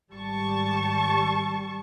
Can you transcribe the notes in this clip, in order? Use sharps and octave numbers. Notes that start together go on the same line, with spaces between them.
G#1 G3 A5 C#6